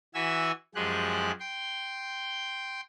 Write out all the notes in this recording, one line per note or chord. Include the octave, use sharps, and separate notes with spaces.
E3 F#4 E5 G#5 E6
F#2 F3 G#3 G4 G#4 F#6
G5 C6